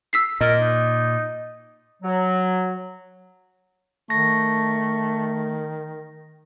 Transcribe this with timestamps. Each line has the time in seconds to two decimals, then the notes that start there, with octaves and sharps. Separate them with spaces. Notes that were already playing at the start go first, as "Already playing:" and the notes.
0.13 E6 B6 C7
0.41 A#2 A#4 D#5
0.61 D#4
2.03 F#3
4.10 D#3 A3 A#6